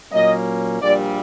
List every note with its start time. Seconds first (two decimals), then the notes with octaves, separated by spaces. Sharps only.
0.11 A#2 F#3 A#3 C#4 D#5
0.81 A#1 A#2 G3 D5